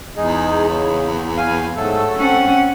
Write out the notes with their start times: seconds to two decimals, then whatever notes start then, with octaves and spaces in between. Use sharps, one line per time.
0.16 E2 G#3 D#4 G#4
0.67 C#3
1.37 F5 G#5
1.77 G#2 F#3 A3 A4
2.16 C4 C#4 F#5